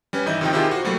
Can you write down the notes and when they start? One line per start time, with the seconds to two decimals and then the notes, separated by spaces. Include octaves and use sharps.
0.13 G3 C#4 B4
0.26 G#1 E3 D#4 E4 D#5 G6
0.41 C3 D#3 F3 G5
0.53 C3 D#3 E4 F4 G4 G#4
0.71 F#4 C5
0.84 F#3 G3 A3 A#3 E4